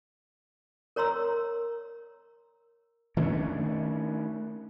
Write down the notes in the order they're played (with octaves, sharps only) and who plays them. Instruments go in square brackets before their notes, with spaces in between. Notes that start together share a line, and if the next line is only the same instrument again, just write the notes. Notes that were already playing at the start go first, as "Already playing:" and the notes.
[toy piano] A#4 C#5 A#5 C6 E6
[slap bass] D#3 A3 C#4 D4